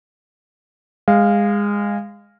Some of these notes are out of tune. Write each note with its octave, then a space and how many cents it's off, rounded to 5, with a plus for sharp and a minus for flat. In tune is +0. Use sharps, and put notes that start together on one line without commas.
G#3 -20 F5 +0